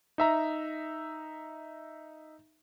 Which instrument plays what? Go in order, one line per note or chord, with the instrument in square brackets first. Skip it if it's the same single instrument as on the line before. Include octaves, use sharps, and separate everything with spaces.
[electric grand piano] D#4 E5 A#5